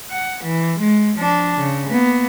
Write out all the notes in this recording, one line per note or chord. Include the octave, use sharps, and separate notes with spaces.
F#5
E3
G#3
F3 D4
C#3
A#3 B3